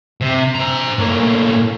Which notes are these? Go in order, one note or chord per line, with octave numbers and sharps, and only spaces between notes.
C3
C5 A#5
A2 A#3